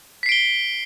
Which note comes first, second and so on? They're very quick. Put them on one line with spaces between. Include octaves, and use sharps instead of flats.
B6 C7 D7 G7